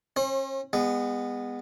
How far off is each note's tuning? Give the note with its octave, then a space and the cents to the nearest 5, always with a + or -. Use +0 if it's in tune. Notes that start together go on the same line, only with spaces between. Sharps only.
C#4 -40 C5 +45
G#3 -35 B3 +0 G5 +0